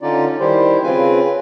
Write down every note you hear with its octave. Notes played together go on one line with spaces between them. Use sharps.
D3 C#4 D#4 F4 D5
D#3 G3 E4 G4 C5
C#3 C4 F4 B4 G#5